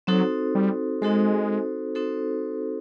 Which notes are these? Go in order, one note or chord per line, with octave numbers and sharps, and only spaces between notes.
F#3 C4 D#4 F#4 A4 C5
G3
G#3 C4 D#4 F#4 A4 C5
C4 D#4 F#4 A4 C5